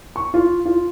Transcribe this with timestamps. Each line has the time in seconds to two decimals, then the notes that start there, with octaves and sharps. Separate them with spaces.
0.16 C#6
0.34 F4
0.65 F4